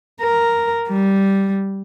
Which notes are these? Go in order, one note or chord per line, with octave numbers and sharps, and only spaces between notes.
A#4
G3